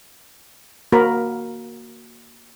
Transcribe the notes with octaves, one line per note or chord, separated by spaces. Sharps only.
A#3 F#4 A#4 B5